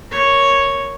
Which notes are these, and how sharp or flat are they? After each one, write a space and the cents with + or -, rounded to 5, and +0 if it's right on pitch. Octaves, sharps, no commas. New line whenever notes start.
A#4 +0 C#5 +0